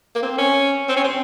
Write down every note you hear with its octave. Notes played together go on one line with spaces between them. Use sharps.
A#3
C4
C#4
C4
C#4
C4